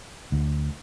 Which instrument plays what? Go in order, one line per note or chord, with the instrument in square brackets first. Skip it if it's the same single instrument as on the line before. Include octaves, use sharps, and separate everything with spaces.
[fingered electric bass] D2